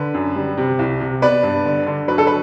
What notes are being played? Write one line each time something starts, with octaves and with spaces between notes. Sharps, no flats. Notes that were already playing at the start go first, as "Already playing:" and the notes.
Already playing: D3 B4
F#2
G3
C3
C2
C3
B3 B4 D5
G2
D3
D3
F#3 B4
A4
B4